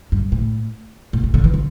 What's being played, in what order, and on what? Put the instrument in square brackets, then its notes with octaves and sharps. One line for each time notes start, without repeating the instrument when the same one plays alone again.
[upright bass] G2
A2
A2
A2
D3
E3
D3